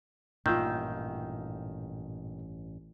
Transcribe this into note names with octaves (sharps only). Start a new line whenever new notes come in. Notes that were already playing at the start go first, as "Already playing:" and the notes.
A1 G2 A#2 D#3 F4 E6 G6